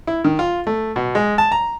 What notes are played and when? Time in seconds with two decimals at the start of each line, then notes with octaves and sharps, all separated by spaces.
0.07 E4
0.24 D#3
0.39 F4
0.67 A3
0.96 B2
1.15 G#3
1.38 A5
1.52 A#5